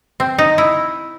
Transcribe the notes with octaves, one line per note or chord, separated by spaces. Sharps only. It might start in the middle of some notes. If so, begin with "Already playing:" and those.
C4
D#4
E4